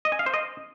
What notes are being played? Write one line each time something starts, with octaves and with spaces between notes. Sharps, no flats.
D#5
G#5
F5
C5
D#5